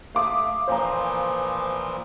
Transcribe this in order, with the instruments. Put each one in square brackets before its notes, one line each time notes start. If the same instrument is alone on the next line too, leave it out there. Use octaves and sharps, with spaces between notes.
[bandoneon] A3 [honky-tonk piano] F5 D6 D#6
[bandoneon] A#2 E3 F3 [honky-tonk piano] C5 F5 A#5